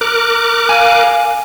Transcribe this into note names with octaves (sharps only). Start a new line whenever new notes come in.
A#4 D6 F#6
F5 G#5